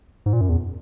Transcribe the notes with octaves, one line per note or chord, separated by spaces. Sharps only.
G#2
A#2
F#2
E2